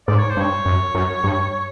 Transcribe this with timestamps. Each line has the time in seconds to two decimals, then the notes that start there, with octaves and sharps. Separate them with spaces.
0.07 G#2 D5
0.19 C#5
0.29 C5
0.37 G2 C#5
0.65 F#2
0.95 F#2
1.24 G2